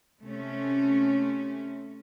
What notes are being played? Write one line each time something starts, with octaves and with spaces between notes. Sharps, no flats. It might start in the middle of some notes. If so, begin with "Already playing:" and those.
C3 A3 C#4